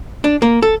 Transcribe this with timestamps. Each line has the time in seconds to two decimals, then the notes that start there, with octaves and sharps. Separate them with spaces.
0.24 D4
0.42 A#3
0.62 A4